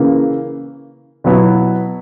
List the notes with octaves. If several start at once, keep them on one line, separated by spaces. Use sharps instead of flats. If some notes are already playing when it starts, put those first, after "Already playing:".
Already playing: C#3 E3 A#3
B2 F#3 B3 E4